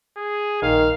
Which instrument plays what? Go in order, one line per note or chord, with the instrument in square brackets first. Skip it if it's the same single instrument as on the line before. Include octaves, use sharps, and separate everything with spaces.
[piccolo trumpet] G#4
[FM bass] A#1 [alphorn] D#3 [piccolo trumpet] F5